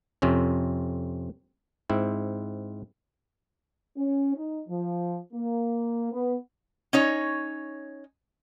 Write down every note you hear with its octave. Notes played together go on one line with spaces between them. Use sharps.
F2 C3 C4 C#4
G#2 C4 E4
C#4
D#4
F3
A#3
B3
C#4 D#4 C#5